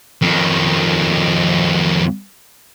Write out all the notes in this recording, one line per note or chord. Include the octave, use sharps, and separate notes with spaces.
F2 D#3